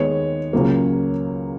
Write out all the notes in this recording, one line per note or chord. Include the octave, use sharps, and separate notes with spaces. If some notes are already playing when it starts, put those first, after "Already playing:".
Already playing: D#2 D#3 G#3 B3 C#5
C#2 C#3 F#3 A#3